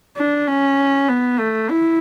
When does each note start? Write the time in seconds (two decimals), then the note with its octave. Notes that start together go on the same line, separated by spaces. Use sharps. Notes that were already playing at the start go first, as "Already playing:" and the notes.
0.17 D4
0.47 C#4
1.09 B3
1.40 A3
1.70 E4